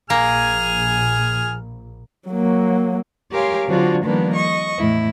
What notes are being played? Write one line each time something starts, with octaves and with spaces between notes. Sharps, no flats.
A#1 A#3 G#4 G#5 F6
F#3 A#3
G4 A#4 C#5 F5 G#5 C6
D3 F#3 C4 D4 F4 F#4
D#3 F3 G3 A#3 B3 D4
D#5 C#6
E2 A2 E4